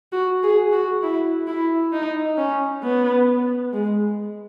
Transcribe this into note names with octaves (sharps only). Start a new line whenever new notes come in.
F#4
G#4
F#4
E4
E4
D#4
C#4
B3
G#3